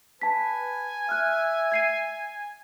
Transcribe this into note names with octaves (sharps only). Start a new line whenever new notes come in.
B4 G#5 A5 B6
E5 F6 F#6
G#6 C7 D#7